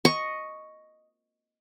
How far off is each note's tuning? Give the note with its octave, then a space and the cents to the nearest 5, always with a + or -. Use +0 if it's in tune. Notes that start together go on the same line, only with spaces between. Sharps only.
D#5 +0 C#6 +0